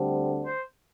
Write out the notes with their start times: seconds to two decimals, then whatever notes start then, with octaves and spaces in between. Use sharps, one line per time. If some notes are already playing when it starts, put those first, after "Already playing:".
Already playing: D2 D3 G3 C4
0.44 C5